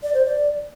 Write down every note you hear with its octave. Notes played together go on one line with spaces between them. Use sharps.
D5
C5
D5